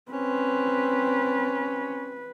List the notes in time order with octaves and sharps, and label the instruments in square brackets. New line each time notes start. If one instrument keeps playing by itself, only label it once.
[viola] C4 [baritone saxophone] C#4 [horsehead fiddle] B4